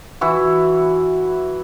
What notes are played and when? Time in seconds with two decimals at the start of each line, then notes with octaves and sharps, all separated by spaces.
0.21 E3 E4 F#4